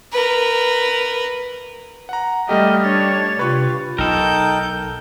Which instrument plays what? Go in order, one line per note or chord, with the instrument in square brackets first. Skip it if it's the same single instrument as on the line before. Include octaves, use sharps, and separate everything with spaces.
[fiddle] A#4 B4
[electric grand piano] F#5 A#5
[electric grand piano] G3 A3 G4 [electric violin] D#5 [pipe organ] F6
[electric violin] D4 C#5 [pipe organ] A6
[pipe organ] C3 [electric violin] F4 G4 [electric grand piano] B4 C#6
[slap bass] B1 [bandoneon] D#4 G5 [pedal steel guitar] A4 A#4 [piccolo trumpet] G6